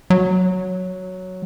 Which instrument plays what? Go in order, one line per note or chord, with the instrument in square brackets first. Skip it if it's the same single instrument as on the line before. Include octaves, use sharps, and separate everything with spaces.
[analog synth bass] F#3